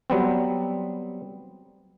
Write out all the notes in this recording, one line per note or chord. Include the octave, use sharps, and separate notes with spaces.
F#3 G3 B3 C4